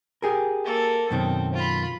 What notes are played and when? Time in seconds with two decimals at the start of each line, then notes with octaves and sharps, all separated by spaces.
0.22 G4 G#4 A#4
0.65 A#3 A4
1.11 F#2 B2 D#3 C4
1.54 F4 B5